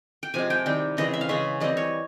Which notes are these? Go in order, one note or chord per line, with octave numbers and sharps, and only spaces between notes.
G5
C3 F3 G#3 G#5
G5
D#3 G3 C4 E4 G5
C#3 E3 G#3 C4 D#5
E5
F5
C#3 E3 G#3 C#4 E5
E3 G3 C4 D#5
C#5